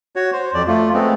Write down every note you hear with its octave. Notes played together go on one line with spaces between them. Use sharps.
F#4 C#5
C5
F2 D5
A3 F4
G#3 A3 B3 C4